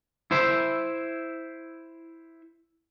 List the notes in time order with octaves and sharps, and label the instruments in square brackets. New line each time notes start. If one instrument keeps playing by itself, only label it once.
[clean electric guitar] E4 C5 E5